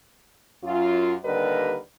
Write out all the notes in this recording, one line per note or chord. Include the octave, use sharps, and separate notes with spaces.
F#2 F4
D#2 D3 G3 A#4 B4 D#5